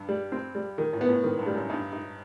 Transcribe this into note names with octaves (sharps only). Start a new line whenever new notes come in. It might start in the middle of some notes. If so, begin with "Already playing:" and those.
Already playing: G2
G3
C4
G3
D#3
A2
B3
A2
G#2 D#3
G2
G3
F#2
G2 D#4
D#4